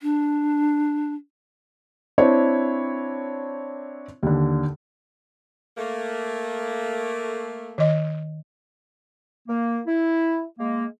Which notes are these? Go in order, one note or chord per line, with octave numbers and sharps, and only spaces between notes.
D4
C4 D4 E4 C5 C#5
D#2 D3
A3 A#3
D#3 D#5
A#3
E4
G#3 A#3